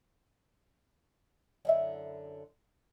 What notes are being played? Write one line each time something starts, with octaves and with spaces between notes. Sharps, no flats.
F#2 D3 E4